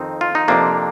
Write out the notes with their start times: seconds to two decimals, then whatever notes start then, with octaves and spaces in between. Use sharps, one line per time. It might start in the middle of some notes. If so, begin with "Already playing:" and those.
Already playing: F2 D#3 C4 D#4
0.21 F4
0.35 D#4
0.48 F2 C3 F3 A#3 D4